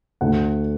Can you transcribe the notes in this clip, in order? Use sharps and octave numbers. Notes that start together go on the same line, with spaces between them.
D2 F#5